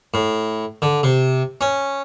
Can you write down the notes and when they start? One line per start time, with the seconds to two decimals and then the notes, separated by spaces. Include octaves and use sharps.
0.14 A2
0.82 D3
1.03 C3
1.61 C#4